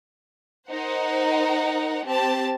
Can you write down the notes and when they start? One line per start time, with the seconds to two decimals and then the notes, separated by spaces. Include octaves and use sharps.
0.69 D#4 A#4 C5 F#5
2.06 C4 G4 A5